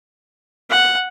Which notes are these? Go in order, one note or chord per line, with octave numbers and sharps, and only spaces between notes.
F#5